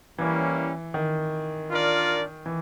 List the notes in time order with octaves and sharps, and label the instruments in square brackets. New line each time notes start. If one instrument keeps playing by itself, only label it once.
[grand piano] E3 [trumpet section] G3 A#3 C#4 E4
[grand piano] D#3
[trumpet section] D4 F4 A#4 D5
[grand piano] E3